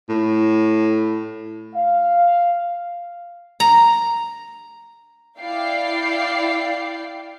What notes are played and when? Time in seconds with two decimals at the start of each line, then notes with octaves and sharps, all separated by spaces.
0.09 A2
1.74 F5
3.60 A#5
5.39 E4 D5 F5 G5 C7